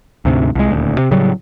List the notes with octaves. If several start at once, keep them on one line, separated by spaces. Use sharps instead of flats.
D2 G#2 C3
C2 G#3
D#1 D2
C3
A2 C#3 F#3 G3